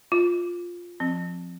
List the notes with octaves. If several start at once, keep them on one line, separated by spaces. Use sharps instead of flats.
F4
F3 C4